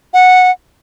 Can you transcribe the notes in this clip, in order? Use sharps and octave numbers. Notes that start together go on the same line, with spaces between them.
F#5